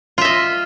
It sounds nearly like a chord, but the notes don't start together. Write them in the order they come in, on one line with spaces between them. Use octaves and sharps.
F4 E5 D#5